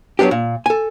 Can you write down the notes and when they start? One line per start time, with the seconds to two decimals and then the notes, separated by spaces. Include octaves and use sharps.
0.19 F#3 G3 B3 D4 G4
0.31 A#2
0.66 A4 G#5